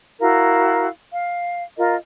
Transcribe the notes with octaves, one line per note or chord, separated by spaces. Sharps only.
E4 F#4 A#4 F5
F5
F4 A#4 D#5